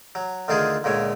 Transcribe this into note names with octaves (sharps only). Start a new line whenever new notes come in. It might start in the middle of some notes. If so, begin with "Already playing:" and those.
F#3
D2 D3 D#3 F4 G#4
C#2 A#2 D3 C#5